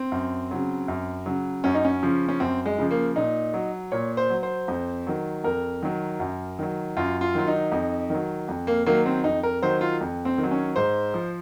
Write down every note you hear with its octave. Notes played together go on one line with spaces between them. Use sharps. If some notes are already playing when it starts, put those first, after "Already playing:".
Already playing: C4
F#2
C#3 F#3
F#2
C#3 F#3
F#2 C#4
D#4
C#4
C#3 F3
C#4
F#2 C4
G#3
C#3 F3
A#3
A#2 D#4
F#3
A#2 C#5
C5
F#3
C5
F2
D#3 F#3
F2 A#4
D#3 F#3
F#2
D#3 F#3
F#2 F4
F4
D#3 F#3 F4
D#4
F2
D#3 F#3
F2
A#3
D#3 F#3 A#3
C4
F2 D#4
A#4
D#3 F#3 C5
F4
F2
C4
D#3
F#3
C#4
G#2 C5
F3